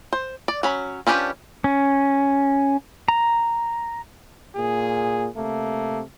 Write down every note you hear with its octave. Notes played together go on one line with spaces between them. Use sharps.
C5
D5
F#3 C#4 B5
F3 C#4 D4 G4 B4
C#4
A#5
A#2 G#4
C3 A3 A#3